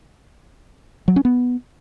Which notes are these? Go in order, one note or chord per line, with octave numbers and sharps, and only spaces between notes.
F#3
C#4
B3